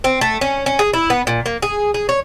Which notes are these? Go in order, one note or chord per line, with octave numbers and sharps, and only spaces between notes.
C4
A3
C#4
C#4
G#4
E4
B3
A#2
A#3
G#4
G#4
C#5